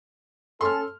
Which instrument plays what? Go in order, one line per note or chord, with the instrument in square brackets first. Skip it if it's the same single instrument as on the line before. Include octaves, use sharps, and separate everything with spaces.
[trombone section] C#4 A4 [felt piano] C6 F6